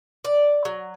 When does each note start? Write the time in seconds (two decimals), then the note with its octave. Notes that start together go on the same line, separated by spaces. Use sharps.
0.25 D5
0.65 F#3